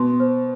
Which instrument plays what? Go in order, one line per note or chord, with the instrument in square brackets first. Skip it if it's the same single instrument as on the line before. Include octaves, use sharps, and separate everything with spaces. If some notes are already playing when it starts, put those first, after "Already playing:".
Already playing: [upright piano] B2 [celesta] C6
[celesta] C5